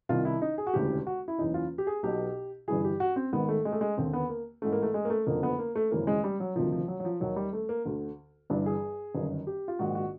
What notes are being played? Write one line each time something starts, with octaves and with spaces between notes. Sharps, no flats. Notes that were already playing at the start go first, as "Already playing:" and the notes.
C2 C3 D#3 F4
E4
D#4
G#4
F#4
E1 D2 C#3 E3 G4
F#4
E4
F#1 E2 C#3 E3 D#4
F4
G4
G#4
B1 B2 G4
G1 G2 E3 G#4
G4
F#4
C4
G#1 G#2 D#3 B3
A3
G#3
A3
G#3
D#2 D3 C4
B3
A#3
A1 G#2 E3 A3
A#3
A3
G#3
A#3
A3
F#1 F2 D3 A#3
B3
A#3
A3
G#1 F#2 C#3 E3 A#3
G#3
G3
F#3
D2 C3 D#3 F3
F3
F#3
F#3
F3
D#2 D#3 F#3
G3
A3
A#3
D2 D3
G1 G2 E3 D4
G#4
G1 F#2 D#3
G4
F4
A#1 G#2 D#3 F#4
F#4